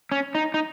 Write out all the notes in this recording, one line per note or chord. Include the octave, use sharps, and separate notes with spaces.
C#4
D#4
D#4